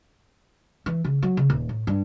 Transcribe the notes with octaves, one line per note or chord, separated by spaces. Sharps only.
E3
C#3
F#3
C#3
D#1
A2
G2